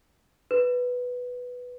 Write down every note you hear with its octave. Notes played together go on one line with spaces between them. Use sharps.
B4